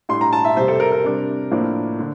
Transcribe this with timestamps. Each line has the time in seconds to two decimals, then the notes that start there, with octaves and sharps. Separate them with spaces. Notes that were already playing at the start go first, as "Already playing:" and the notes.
0.09 A2 G3 D4 C6
0.21 A#5
0.33 A5
0.45 E5
0.57 F2 C3 G3 C5
0.68 A4
0.80 A#4
0.92 A#4
1.04 C3 G3 D4
1.51 A2 F3 A#3 D4
1.99 D3